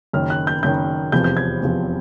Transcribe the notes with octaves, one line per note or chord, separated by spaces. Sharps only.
F#1 F#2 D#3 F6
F#6
G6
F#1 F#2 D#3 G6
F1 E2 C3 F3 G6
G6
G#6
F1 E2 C3 F3